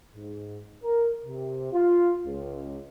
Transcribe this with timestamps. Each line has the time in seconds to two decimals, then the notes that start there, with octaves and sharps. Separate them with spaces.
0.15 G#2
0.83 A#4
1.25 C3
1.72 F4
2.25 C#2